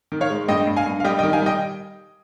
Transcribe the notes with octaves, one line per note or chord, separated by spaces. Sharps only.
D#3
C#5 F5
G#3
G2 D#5 G5
G2
F5 G#5
G2
F5
G3 D#5 G5
D#5 G5
D#3
F5 G#5
G3 D#5 G5